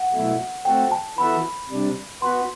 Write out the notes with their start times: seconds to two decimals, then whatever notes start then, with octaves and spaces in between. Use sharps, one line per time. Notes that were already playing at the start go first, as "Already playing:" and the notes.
Already playing: F#5
0.13 B2 F#3 A3 E4
0.65 A3 C4 F#4 A4 G5
0.92 A5
1.18 E3 B3 F#4 A4 E5 B5
1.70 C3 G3 D4
2.22 B3 F#4 B4 C6